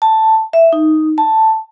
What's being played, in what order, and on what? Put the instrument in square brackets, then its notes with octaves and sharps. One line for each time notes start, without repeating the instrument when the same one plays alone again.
[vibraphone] A5
E5
D#4
A5